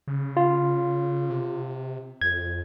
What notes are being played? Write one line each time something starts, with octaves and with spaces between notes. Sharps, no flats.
C#3
F4
C3
F2 G#6